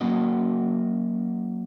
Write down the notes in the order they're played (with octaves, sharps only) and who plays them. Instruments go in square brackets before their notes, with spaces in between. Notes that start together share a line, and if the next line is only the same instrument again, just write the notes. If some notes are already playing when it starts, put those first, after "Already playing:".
[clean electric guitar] F#3 A#3 C#4 F#4 D#5